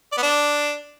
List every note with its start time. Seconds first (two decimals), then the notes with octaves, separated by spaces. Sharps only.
0.12 D5
0.18 B3
0.23 D4